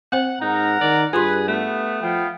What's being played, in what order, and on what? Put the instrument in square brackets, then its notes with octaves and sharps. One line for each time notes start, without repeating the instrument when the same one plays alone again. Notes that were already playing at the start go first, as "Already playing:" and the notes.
[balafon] C4 C5 [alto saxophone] F#5
[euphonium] G#2 [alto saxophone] D#4 [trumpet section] A#4 F#5 A#5
[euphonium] D#3 [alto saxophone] D5
[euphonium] G2 [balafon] F4 G4 C6 [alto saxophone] G#4 [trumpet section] B4
[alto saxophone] A3 [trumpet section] B3
[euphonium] F3 [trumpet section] B3 F5 G5